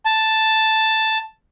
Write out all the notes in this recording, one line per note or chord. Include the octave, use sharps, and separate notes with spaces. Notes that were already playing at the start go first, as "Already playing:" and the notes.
A5